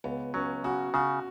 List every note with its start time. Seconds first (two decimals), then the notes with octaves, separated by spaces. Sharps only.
0.04 C#2 B3
0.34 F#3 C#4
0.64 C#3 F#4
0.94 C#3 F#4